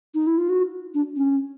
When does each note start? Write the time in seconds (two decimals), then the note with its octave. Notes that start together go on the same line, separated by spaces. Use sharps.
0.14 D#4
0.27 E4
0.38 F4
0.49 F#4
0.94 D4
1.16 C#4